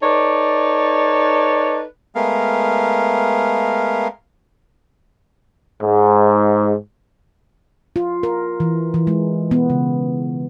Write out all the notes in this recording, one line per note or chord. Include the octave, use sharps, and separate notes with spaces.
D#4 A4 B4 C#5 D5
G#3 A3 B3 A#4 F5
G#2
F4
A#4
E3
E3
G#3
B3
C#3